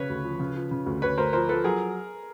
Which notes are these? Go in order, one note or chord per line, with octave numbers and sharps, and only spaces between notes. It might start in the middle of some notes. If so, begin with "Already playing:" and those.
Already playing: C#3 B4 C#5
D2
F3
C#3
F3
C#3
D2
D2 B4 C#5
D2 A#4 C5
F3 A#4 C5
F3 A4 B4
F#3 G#4 A#4